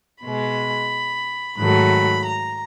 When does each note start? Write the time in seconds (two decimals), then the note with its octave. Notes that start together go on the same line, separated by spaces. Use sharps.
0.23 B2 G#3 B5
1.57 G#2 D#3 F#3 A3 B5
2.25 A#5